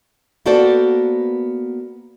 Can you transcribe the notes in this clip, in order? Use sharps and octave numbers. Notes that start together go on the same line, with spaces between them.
A#3 B3 F#4 A4 C5 D5